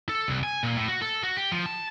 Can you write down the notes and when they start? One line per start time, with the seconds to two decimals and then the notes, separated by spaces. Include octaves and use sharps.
0.09 A4
0.28 C2
0.44 G#5
0.63 A#2
0.76 A2
0.88 F#4
1.02 A4
1.24 F#4
1.37 G4
1.52 F3
1.66 A5